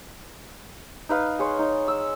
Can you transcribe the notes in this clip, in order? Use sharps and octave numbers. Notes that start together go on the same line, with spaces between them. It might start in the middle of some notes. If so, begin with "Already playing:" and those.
D#4 B4 F5
G#4 C#5 C6
D#4
E6